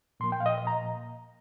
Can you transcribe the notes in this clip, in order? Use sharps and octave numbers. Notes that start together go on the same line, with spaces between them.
A#2 F3 A#3 C6
G5
F5
D#5
D#5
A#5